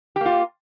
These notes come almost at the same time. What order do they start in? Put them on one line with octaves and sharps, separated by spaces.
G4 A#3 F4